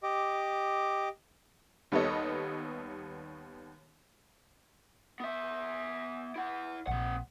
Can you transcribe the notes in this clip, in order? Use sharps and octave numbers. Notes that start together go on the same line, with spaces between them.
G4 D#5 D6
D#2 G3 B3 A4 C#5 D#5
B3 E5
E4 F#5
A#1 A#2 C4 F#5